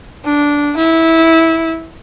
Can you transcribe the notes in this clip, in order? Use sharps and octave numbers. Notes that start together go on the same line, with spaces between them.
D4
E4